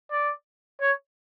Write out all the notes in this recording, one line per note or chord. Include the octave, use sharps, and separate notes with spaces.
D5
C#5